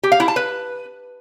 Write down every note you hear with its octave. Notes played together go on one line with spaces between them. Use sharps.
G4
F5
E4
A5
B4